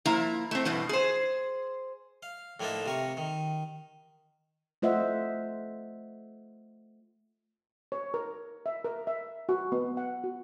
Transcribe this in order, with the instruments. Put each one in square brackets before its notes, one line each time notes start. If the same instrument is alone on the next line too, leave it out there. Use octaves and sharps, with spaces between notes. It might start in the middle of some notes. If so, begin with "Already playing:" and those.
[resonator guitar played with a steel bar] F3 A#3 E4 A#5
A3 C4
G2 B2 E3
G#4 C5
[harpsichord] F5
A2 F3 A#3 D4 D#4 A5
C3 A#4 C#6
D#3
[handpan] A3 F4 C5 D#5 E5 F#5
[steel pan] C#5
A#4
E5
A#4
E5
F#4
B3
F#5
F#4